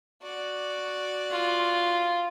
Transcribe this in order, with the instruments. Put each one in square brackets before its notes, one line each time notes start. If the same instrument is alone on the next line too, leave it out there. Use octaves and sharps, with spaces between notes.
[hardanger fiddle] F#4 D5
[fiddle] F4